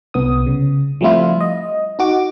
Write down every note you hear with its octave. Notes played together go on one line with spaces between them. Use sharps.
C2 B3 D#6
C#3
F3 G3 A3 C4 E4 F4
D#5
D#4 F#4 D6